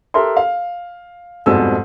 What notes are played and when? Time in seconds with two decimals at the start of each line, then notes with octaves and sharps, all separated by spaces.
0.14 G4 A4 A#4 E5 C6
0.37 F5
1.46 F2 G#2 B2 G3 A4 E6